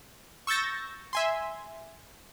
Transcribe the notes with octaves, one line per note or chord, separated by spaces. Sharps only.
C#6 E6 G6 A6 A#6
E5 G#5 C6